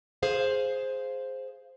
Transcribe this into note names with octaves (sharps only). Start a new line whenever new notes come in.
G#4 C5 F5